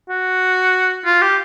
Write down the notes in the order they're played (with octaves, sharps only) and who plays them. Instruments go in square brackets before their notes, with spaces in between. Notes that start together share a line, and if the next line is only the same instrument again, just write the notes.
[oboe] F#4
F4
G4